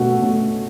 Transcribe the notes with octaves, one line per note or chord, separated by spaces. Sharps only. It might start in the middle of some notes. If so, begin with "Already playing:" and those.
Already playing: B2 A3 C#4 F#4
A3 C#4